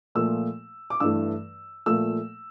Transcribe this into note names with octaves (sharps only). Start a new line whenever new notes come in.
A#2 F3 A3 E6
D6
G2 E3 A3 E6
A#2 F3 A3 E6